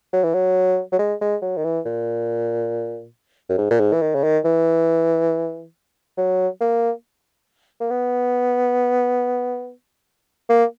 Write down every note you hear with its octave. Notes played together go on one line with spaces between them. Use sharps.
F#3
E3
F#3
F#3
G#3
G#3
F#3
D#3
E3
A#2
F#2
G#2
A#2
G#2
E3
D#3
C#3
D#3
E3
F#3
A#3
A#3
B3
A#3